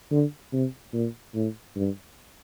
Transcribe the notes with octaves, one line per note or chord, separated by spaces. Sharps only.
D3
C3
A#2
A2
G2